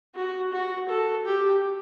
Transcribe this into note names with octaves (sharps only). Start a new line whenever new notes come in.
F#4
F#4
A4
G4